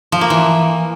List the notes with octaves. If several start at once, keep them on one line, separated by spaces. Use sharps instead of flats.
F3
A#3
E3